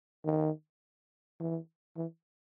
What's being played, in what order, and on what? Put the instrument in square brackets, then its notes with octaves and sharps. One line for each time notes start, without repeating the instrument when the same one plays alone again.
[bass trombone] D#3
E3
E3